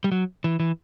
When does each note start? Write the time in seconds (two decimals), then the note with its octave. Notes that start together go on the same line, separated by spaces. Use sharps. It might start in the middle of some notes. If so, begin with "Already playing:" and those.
0.04 G3
0.12 F#3
0.44 E3
0.60 E3